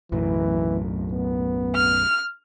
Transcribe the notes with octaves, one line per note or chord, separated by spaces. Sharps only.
B1 F#2 A2 E3
B3
F6